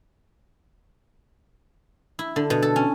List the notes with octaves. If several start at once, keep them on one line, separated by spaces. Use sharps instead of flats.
E4
D3
B2
A4
C#4